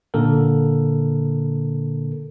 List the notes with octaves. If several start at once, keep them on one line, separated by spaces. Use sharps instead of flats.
A#2 D3 A#3 A4 A#4